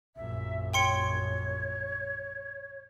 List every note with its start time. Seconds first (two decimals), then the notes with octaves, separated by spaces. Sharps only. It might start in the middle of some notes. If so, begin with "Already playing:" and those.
0.16 A#1 F#2 E5
0.74 C#5 G5 C6 C#7